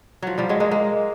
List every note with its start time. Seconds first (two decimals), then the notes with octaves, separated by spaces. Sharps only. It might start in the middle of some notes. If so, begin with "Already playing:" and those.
0.22 F3 F#3
0.38 F3 G3
0.49 F#3 G#3
0.60 G#3 A#3
0.71 G#3 A#3